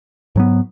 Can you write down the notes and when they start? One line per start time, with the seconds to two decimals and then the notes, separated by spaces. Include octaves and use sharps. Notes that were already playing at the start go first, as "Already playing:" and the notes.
0.36 G#2 F#3 B3